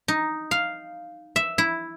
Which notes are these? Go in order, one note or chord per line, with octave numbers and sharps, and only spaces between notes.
D#4
F5
E5
E4